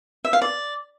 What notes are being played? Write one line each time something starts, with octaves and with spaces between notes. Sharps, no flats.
E5
F5
D5